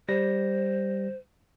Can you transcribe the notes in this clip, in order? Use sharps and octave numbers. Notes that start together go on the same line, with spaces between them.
G3 C5 A#6